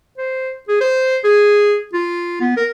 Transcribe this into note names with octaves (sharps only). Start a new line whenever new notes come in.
C5
G#4
C5
G#4
F4
B3
A#4